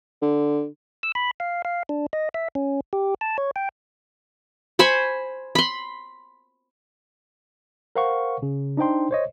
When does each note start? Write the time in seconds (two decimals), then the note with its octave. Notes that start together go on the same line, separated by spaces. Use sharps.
0.22 D3
1.03 E6
1.15 B5
1.40 F5
1.65 F5
1.89 D4
2.13 D#5
2.34 E5
2.55 C#4
2.93 G4
3.21 A5
3.38 C#5
3.56 G5
4.79 C5 G#5 B5 C#6
5.55 B5 C6
7.96 A#4 C5 F5 F#5 C#6
8.42 C#3
8.77 D4 D#4 C5 G5 C6
9.11 C5 C#5 D#5